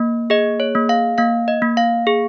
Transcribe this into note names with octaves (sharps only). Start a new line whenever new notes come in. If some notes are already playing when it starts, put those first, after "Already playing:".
Already playing: A#3
G#4 D#5
C#5
A#3
F5
A#3 F5
D#5
A#3
F5
G#4